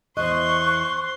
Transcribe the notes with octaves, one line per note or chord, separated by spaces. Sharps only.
E2 C5 D#5 C6 C#6 F#6